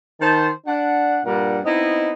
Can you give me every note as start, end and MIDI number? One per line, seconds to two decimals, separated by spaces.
0.20 0.48 51
0.20 0.48 72
0.20 0.48 81
0.67 1.20 62
0.67 1.20 78
1.25 1.59 43
1.25 1.59 46
1.25 1.59 55
1.25 1.59 62
1.25 1.59 70
1.25 1.59 78
1.64 2.12 59
1.64 2.12 60
1.64 2.12 63
1.64 2.12 64
1.64 2.12 75